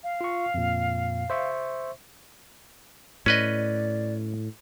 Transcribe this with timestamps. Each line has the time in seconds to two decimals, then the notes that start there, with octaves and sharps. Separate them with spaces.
0.04 F5
0.21 F4 C#6
0.54 F2 A#2
1.30 C5 E5 C#6
3.26 A2 C#4 B4 D5 D#5